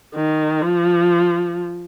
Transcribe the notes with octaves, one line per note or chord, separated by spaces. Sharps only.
D#3
F3